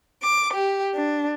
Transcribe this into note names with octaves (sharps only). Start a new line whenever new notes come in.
D6
G4
D4